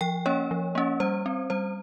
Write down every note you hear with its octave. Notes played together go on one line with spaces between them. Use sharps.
F3 G5
A#3 C#4 C#5
F3
A#3 C#4
G3 C5
C4
G3 C5